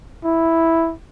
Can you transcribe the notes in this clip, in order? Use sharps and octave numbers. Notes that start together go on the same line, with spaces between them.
E4